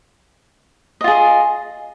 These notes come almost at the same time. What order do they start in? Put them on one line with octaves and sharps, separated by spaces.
D#5 F4 G#4